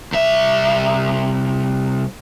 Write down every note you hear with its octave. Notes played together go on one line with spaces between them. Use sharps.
C2 E5